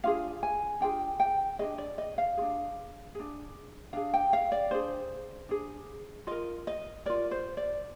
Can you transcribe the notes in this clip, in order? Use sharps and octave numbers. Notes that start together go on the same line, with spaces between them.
D4 F4 G#4 F5
G#5
D4 F4 G#4 G5
G5
D4 F4 G#4 D#5
D5
D#5
F5
D4 F4 G#4
D4 G#4
D4 G#4 F5
G5
F5
D5
D4 G#4 C5
D4 G#4
F4 A#4 D#5
D#5
F4 A#4 D5
C5
D5